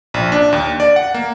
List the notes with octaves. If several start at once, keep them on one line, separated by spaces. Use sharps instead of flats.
A#1
D4
D#2
D5
F#5
A#3